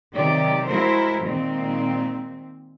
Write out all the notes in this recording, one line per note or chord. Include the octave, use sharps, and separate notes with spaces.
C3 D#3 F#3 G4 D5
G#3 E4 F#4 A#4 C5
A#2 D#3 G#3 C4